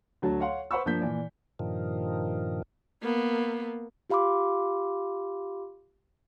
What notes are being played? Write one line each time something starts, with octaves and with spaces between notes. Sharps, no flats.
D2 F#3 F#4 A5
C#5 F5 F#5 C6
B4 C5 F#5 B5 C#6 E6
G2 F3 A#3 G6 B6
A#2 E3 D5
G2 A#2 D#3 F3
A#3 B3
F4 G4 F5 B5 C6 D6